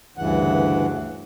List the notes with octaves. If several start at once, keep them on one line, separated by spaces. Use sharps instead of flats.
D2 G2 C#3 E3 F#5